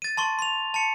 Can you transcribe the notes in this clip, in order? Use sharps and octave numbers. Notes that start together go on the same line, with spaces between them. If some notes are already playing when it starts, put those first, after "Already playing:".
A6 D#7
A5 C6 C#6
C6 F7
A5 C#7